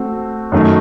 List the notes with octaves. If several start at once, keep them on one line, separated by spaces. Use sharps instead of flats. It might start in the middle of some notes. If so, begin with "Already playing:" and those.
Already playing: A3 C4 F#4
F#2 D#3 F#3 A3